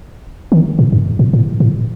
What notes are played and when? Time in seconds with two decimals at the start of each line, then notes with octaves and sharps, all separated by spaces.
0.52 D#3
0.79 A2
0.92 F#2
1.19 A2
1.33 A2
1.60 A2